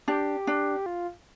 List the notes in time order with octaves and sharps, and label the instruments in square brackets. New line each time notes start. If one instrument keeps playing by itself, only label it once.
[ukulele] D4 [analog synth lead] G4
[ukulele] D4
[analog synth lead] F4